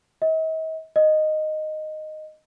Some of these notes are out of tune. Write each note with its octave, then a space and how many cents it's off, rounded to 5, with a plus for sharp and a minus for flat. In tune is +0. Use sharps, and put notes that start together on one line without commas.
D#5 +45
D#5 -10